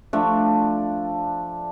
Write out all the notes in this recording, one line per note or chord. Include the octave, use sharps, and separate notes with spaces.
F3 A3 D4